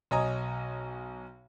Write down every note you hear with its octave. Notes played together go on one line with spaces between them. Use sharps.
B1 C#5 D#5 G#5 A#5 D#6